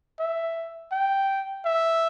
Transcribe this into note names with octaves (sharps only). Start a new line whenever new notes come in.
E5
G5
E5